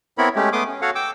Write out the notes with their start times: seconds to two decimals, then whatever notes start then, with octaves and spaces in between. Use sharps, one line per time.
0.18 B3 C4 E4 A#4 C#5 B5
0.36 G#3 A3 C#4 G4
0.53 A3 B3 C6 D6 D#6
0.67 C#4
0.82 F#4 A4 C#5 F5 F#5
0.95 G5 D6 E6